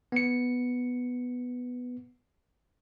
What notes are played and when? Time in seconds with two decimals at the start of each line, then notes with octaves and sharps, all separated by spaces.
0.12 B3 C#7